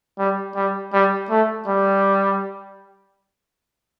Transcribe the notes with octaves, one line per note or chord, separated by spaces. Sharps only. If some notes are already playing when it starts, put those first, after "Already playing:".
G3
G3
G3
A3
G3